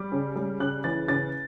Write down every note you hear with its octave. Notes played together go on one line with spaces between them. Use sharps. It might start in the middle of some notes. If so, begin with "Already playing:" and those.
Already playing: G3 D6
C#3
G3
C#3 F#6
E3 A6
C#3 A6